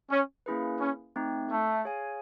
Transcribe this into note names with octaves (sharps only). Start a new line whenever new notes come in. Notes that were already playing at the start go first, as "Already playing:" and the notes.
C#4
A#3 C#4 E4 G#4 B4
C#4
A3 C4 D#4
A3
G#4 C#5 F5 G#5